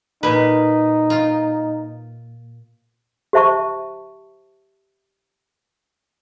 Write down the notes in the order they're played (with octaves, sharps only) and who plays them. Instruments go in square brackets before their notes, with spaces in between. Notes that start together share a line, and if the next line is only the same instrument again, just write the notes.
[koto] A#2 B4 [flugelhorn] D#4
[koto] F4
[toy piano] G4 C5 E5 A5 C#6